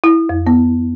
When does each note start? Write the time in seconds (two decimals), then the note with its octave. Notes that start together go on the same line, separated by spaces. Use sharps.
0.04 E4
0.29 F2
0.47 B3